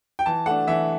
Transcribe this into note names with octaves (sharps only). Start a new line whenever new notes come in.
G5
E3 A5
A3 D4 F#5
E3 E5